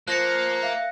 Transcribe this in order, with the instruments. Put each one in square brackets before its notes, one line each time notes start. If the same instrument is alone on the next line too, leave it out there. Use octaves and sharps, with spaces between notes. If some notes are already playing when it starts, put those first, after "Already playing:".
[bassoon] F3 [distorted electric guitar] A#3 [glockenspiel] F#6 A#6 C#7
[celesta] E5 F5